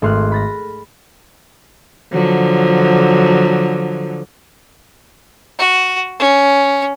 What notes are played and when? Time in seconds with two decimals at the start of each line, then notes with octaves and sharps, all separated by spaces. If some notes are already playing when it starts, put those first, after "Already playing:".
0.02 G#1 A3 C6 F6 F#6
0.32 B5 A6 A#6
2.12 D3 F3 F#3
5.59 F#4
6.19 C#4